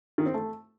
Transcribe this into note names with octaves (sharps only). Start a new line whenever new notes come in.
D#3
C4
A3